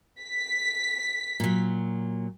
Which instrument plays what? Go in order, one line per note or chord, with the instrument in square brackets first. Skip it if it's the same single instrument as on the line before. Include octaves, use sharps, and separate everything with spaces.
[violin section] B6
[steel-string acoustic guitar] A#2 F#3